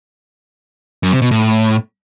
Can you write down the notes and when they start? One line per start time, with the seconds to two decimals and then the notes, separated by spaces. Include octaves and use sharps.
1.03 F#2
1.12 C3
1.22 B2
1.31 A2